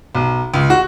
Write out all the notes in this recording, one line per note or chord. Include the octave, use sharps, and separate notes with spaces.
B1
C#2
F#4